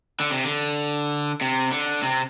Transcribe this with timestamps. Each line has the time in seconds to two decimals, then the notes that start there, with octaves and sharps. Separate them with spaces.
0.20 D3
0.31 C3
0.44 D3
1.41 C3
1.72 D3
2.02 C3